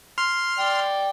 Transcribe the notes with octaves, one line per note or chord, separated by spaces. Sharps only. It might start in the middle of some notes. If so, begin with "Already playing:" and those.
C6 F6
D5 G5